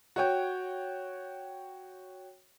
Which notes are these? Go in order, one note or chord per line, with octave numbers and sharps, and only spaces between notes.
F#4 C#5 G5